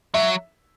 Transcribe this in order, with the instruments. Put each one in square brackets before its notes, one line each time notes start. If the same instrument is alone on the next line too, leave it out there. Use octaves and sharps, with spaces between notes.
[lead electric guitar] F#3 [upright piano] E5